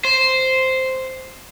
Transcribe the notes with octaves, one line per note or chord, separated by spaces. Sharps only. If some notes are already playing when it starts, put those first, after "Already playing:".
C5